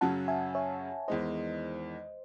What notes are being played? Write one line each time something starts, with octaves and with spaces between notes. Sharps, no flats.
F#2 C#3 F#3 C#4 F#5 A5
E5 G#5
C#5 E5
E2 D#3 G#3 D#4 C5 D#5